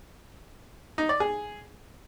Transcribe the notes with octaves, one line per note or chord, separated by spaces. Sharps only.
D#4
D5
G#4